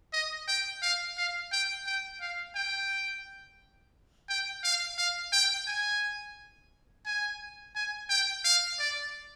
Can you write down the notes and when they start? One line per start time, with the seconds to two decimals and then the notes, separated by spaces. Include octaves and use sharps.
0.13 D#5
0.48 G5
0.82 F5
1.18 F5
1.52 G5
1.86 G5
2.21 F5
2.55 G5
4.29 G5
4.64 F5
4.98 F5
5.33 G5
5.67 G#5
7.06 G#5
7.75 G#5
8.10 G5
8.45 F5
8.79 D5